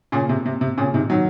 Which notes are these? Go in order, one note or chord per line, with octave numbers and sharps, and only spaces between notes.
A#2 C#3
C3
C3
C3
A#2 C#3
C3 D#3
D#3 F#3